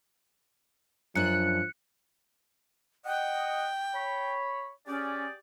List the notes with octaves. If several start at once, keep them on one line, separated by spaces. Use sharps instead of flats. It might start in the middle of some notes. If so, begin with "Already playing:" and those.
F#2 F3 D4 F#6 C#7
D#5 F#5 G5
C#5 B5
C#4 G4 G#4 D5